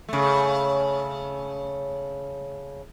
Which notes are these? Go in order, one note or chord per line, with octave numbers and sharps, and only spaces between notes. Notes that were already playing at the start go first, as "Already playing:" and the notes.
C#3 A3